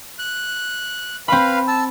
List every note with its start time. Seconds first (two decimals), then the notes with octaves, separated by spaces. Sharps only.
0.19 F#6
1.28 C4 B4 F5 B5
1.68 A5 E6